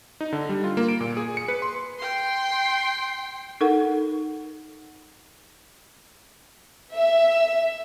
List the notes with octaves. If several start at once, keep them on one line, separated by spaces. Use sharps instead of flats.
D#4
D3
G3
F4
A#3
D7
A#2
G#4
C#7
B4
C6
G5 C6
D#4 A4 A#4 F#5
E5